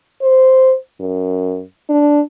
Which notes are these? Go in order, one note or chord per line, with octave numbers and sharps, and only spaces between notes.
C5
F#2
D4